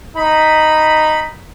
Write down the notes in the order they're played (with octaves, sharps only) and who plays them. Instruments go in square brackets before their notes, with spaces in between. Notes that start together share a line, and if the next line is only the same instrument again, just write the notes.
[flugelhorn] D#4 [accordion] B5